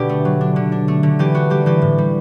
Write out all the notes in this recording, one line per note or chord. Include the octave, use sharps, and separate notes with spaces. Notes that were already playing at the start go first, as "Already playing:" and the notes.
Already playing: B2 D3 D4 G4
A3
F#3
D4
D3
D4
A3
D3
E3 G4
D4 F#4
G3 G4
E3 G4
A2
G3